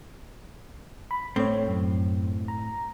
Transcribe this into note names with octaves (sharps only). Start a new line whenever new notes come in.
B5
A2 A3 C4 C#5
F#2
A#5